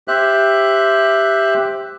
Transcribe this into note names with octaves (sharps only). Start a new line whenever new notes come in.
G4 C5 E5 F#6